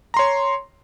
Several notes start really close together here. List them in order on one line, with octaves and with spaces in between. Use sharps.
A#5 C6 C#5